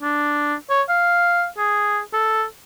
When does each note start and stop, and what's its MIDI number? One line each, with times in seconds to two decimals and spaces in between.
0.02 0.55 62
0.70 0.82 73
0.89 1.47 77
1.58 2.01 68
2.13 2.45 69